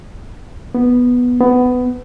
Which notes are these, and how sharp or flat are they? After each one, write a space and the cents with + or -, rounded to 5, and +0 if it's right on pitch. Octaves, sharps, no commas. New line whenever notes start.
B3 -5
B3 +15